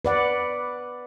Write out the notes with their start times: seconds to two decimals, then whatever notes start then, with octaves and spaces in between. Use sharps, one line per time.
0.05 B4 D5 F#5